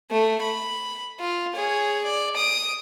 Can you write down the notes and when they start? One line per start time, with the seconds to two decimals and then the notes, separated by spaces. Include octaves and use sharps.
0.11 A3
0.42 B5
1.20 F4
1.55 G#4 C#5
2.04 D5
2.36 D#6 D7